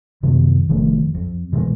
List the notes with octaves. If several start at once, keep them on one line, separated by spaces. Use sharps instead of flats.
F#2 C3 D#3 B3
F1 D#3 F3 A3
F2
B2 E3 G3 G#3